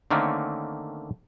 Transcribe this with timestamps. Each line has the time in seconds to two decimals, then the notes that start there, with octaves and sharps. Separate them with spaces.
0.11 D3 D#3 A3 A#3 C4 C#4